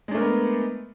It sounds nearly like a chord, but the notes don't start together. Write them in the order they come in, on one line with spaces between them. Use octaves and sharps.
G#3 D4 A3 A#4 B3